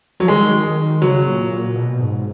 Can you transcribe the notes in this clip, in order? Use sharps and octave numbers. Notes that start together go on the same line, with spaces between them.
F3 F#3
D#3 G#3
C#3 F#3
A#2
A#2
B2
G#2